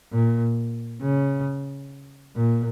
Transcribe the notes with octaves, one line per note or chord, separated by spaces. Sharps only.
A#2
C#3
A#2